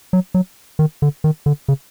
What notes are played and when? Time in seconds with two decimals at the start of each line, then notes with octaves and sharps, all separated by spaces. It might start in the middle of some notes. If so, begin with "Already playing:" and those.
0.13 F#3
0.34 F#3
0.79 D#3
1.02 D3
1.24 D#3
1.46 D3
1.68 C#3